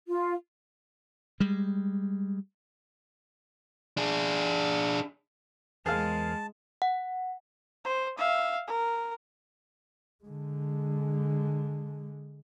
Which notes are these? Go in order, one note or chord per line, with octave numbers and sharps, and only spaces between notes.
F4
G3 G#3
D4 G#4
E2 G#3 G#4 A#4 C5 F5 A5
F#5
C5
E5 F5
A#4
D3 G#3